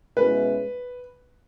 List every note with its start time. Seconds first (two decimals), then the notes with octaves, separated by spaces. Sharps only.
0.17 B2 G#3 C#4 E4 B4